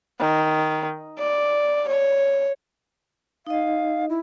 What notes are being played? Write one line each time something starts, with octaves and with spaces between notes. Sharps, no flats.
D#3
D5
C#5
D#4 D#5 F5
E4